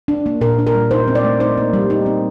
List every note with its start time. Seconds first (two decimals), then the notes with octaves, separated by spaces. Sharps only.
0.08 D4
0.26 A#3
0.41 A#2 A#4
0.59 D4
0.67 A#4
0.75 G3
0.91 D#4 C5
1.08 C4
1.15 D5
1.24 A3
1.40 D#4 C5
1.57 A#3
1.73 G3
1.90 D#4
2.06 C4